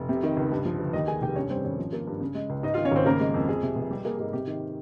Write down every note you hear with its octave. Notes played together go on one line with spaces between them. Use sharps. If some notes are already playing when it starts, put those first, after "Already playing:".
Already playing: F1
C3
D#3
C#2
G2
F3
G1
D#2 D#4 D#5
D#3 G#4 G#5
F1 G4 G5
G2 C#4 C#5
G3 C4 C5
G#1 C#4 C#5
F3
A#3
G2
C#3
G#3
C#2
G#2 D#4 D#5
F4 F5
D#3
C#4 C#5
G#1 C4 C5
C#3 A#3 A#4
G#3
F2
F2 G#4
C3
F1
G3 G4
A#3 G#4
G#2 G#4
C3 G4
D#3